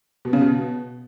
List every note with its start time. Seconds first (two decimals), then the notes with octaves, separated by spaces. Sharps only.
0.25 B2
0.33 C#3
0.41 B2